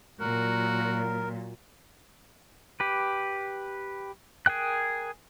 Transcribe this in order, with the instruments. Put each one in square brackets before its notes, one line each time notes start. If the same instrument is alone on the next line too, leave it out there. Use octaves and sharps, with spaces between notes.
[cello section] A#2 F#3 [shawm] F#4 [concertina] A#4
[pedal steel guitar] G4 B4
G#4 A#4 G5 F#6